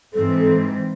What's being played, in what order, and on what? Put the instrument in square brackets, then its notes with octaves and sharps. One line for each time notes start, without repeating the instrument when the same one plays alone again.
[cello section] G#2 E3 C4 [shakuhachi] A4